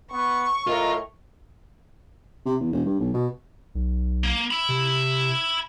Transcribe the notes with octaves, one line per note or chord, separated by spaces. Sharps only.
B3 C#6
A2 F4 A#4 D#5
C3
E2
E1
G2
B1
B2
B1
A#3
E5 B5
C3